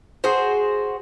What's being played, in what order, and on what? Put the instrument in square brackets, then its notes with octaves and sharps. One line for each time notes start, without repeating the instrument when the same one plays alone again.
[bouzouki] F#4 G#4 C5